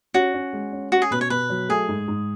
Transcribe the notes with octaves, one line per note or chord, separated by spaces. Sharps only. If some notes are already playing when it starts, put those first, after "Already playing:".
C#4 F#4
C#4
G#3
C#4
C#4 F#4
G#4
B2 B4
C#5
B2 B4
F#3
A3 G#4
G#2
G#2